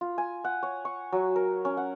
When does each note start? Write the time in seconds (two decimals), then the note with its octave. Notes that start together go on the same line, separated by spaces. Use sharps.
0.01 F4
0.18 G#5
0.44 F#5
0.63 C#5
0.85 C#6
1.12 F#3
1.36 A#4
1.65 C#4
1.77 F#5